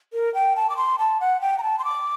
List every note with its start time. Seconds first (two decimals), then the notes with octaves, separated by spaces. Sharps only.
0.13 A#4
0.34 G5
0.56 A5
0.70 D6
0.77 C6
0.99 A5
1.21 F#5
1.41 G5
1.58 A#5
1.63 A5
1.79 C6
1.84 D6